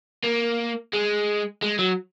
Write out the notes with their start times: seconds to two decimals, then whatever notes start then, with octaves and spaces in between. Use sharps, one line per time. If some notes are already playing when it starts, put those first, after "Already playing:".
0.24 A#3
0.93 G#3
1.62 G#3
1.79 F#3